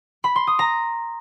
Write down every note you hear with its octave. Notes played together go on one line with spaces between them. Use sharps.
B5
C6
D#6
A#5